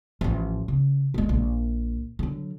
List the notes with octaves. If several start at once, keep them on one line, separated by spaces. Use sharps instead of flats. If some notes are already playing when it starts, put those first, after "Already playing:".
A1 F3
C#3
D3 G#3
A#1
D3 F#3